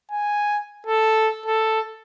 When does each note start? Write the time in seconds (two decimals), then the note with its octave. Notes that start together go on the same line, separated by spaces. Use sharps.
0.11 G#5
0.86 A4
1.46 A4